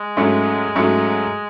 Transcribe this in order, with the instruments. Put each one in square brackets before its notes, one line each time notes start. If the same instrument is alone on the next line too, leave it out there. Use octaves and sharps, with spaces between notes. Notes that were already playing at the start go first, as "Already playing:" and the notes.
Already playing: [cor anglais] G#3
[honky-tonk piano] G#2 F#3 A3 C#4
G#2 F#3 A3 C#4